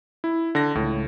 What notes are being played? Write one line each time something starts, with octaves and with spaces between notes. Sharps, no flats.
E4
D3 A#6
C#2 A2